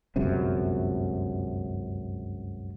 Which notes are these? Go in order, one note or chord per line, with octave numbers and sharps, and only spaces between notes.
G1 C#2 F#2 C3